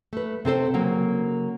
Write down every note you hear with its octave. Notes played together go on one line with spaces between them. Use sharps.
A3 B4
C3 C4 A4 C5
C#3 F#3 A#3